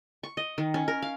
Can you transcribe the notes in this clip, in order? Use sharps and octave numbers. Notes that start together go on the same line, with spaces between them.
C#6
D#5
D#3
C#4
A#4
F5